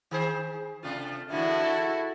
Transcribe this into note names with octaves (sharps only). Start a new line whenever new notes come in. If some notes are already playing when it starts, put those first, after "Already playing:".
D#3 G#4 C5
C3 A3 F4
E2 A2 D3 E4 F#4
A4